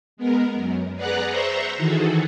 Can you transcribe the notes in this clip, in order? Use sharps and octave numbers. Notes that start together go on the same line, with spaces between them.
G#3 B3 A#4
F#2
G#4 B4 D5 F#5 A#5 F#6
C5 E5 A#5 C6 C#6
D#3 E3 F#4 G#4 A4